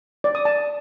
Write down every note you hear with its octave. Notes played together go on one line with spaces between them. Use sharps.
D5
D#6
A5